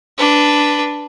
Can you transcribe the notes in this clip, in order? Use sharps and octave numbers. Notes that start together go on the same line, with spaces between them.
D4 B4